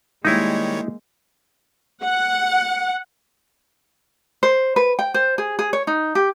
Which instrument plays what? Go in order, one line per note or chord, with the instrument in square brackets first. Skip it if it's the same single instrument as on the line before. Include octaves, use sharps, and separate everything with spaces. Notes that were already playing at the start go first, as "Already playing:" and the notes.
[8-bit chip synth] D#3 G3 C#5 [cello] G#3 A#3 [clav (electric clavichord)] D#4 E4
[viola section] F#5
[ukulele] C5
B4
G5
C5
G#4
G#4
C#5
D#4
G4